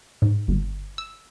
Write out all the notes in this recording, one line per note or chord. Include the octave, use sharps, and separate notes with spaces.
G#2
G1
E6